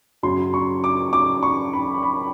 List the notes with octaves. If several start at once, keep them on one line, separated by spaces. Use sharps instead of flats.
F#2 C#3 F#3 C6
C#6
D6
D6
C#6
B5
B5